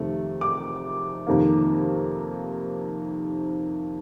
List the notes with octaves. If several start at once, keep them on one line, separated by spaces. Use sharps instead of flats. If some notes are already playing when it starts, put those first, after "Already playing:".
Already playing: F2 C3 D#3 A3
D6
F2 C3 D#3 A#3